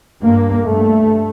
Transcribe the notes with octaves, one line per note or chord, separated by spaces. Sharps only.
G2 A#3
G2 A3